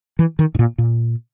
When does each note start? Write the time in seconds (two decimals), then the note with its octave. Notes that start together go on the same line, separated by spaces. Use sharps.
0.19 E3
0.39 D#3
0.55 G#2
0.59 A#2
0.78 A#2